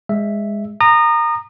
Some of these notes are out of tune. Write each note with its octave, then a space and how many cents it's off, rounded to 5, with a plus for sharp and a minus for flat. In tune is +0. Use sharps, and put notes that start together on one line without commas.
G#3 -15 E5 +0
A#5 -10 D#6 -30